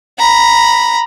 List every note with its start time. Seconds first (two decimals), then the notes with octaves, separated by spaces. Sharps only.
0.19 A#5 B5